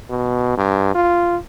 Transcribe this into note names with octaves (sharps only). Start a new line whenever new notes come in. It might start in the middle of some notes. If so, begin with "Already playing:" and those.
B2
G2
F4